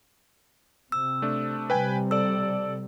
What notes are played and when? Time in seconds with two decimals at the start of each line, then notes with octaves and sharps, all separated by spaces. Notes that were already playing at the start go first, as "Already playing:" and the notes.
0.92 C3 E6
1.22 A3 D4
1.70 C3 G3 B4 G5 G#5
2.11 A4 D5 E6